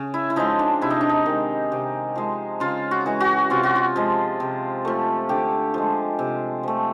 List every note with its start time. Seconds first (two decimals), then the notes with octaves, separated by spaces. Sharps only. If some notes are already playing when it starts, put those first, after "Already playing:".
Already playing: C#3
0.14 E4
0.30 E4
0.36 F3 G#3 D#4
0.59 D4
0.82 C3 E4
0.90 D#4
1.01 D4
1.09 D#4
1.26 D#3 G#3
1.72 C3
2.16 F3 G#3
2.60 C#3 F4
2.91 F#4
3.06 E3 G#3
3.20 F#4
3.50 C3 F4
3.63 F#4
3.76 F4
3.96 F3 G#3
4.40 C3
4.85 F3 A3
5.29 D3 G4
5.74 F3 G#3
6.19 C3
6.63 F3 A3